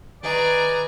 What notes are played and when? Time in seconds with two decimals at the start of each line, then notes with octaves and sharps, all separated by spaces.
0.23 D#3 G#4 B4 D5 D#5 A#5 C#6